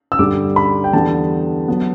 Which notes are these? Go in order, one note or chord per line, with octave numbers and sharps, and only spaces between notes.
E6
G2 D3 G3 D6
B5
G5
E2 D3 G3 B3 A5
F#3 B3